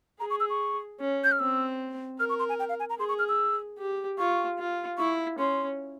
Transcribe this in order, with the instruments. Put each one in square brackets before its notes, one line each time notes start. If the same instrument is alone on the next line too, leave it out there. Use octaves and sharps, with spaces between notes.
[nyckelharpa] G#4 [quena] A#5
[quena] C#6
E6
C#6
[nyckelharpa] C#4
[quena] G6
F6
[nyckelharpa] C4 [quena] E6
[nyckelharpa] A#4 [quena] F6
[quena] C#6
C6
G#5
G5
F5
G#5
A#5
[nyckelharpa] G#4 [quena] C6
[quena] C#6
F6
E6
[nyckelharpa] G4
[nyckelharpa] F4 [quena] C#6
[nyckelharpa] F4
[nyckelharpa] E4 [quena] C#6
[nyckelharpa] C#4 [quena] C6